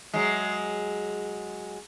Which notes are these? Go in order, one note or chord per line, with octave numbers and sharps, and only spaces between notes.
F#3 G#3